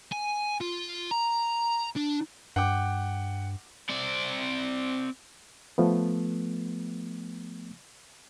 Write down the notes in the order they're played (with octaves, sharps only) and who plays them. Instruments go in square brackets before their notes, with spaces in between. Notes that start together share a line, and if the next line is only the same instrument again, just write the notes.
[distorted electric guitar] G#5
F4
A#5
D4
[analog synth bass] G2 [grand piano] F#5 G5 D6
[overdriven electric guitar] C4 D5
[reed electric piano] F3 A3 B3